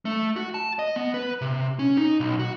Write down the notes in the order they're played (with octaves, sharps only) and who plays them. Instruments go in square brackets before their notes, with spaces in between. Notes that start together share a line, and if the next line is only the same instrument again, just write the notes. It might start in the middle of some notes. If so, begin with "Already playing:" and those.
[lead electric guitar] A3
F#4
A5
D#5
B3
B4
C3
C#4
D#4
B1
F#4